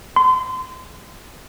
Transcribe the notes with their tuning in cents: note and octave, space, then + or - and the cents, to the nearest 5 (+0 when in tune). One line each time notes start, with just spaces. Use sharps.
C6 -30